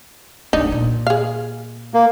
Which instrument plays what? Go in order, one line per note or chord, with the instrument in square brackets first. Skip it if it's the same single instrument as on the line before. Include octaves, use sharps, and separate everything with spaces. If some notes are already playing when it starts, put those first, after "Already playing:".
[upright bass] C2 A3 [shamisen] D4 D#4
[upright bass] A#2
[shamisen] G#4 F5
[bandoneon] A#3